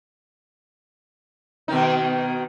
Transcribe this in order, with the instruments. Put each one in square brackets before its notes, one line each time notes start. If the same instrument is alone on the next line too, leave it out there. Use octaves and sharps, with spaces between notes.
[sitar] B2 D#3 D#4